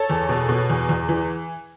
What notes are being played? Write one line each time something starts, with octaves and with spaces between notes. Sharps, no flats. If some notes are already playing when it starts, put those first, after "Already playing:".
Already playing: A4 C#5
E2
B2
B2
E2
E2
E3